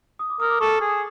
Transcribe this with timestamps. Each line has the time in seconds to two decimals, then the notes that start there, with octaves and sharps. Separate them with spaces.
0.19 D#6
0.30 D6
0.40 A#4 D#6
0.50 D6
0.61 A4 C#6
0.81 G#4